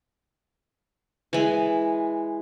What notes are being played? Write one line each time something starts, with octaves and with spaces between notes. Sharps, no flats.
E3 G#3